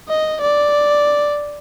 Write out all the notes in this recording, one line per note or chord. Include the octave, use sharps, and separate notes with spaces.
D#5
D5